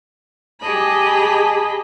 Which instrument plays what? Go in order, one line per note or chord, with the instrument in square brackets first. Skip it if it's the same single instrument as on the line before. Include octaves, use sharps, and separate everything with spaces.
[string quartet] G4 G#4 D#5 A5 B5